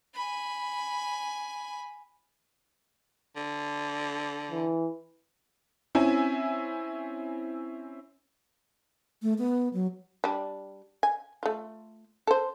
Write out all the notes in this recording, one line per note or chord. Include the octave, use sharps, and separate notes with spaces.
G#5 B5
D3
E3
C4 C#4 E4 E5 G#5
A3
B3
F#3
G3 D4
G#5
A3 F4
A4 C5